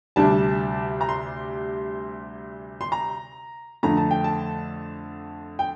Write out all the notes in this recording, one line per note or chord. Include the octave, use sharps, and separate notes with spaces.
D2 C3 G3 D4 A5
A#5
C6
C6
A#5
F2 D3 A3 A#5
A5
G5
A5
G5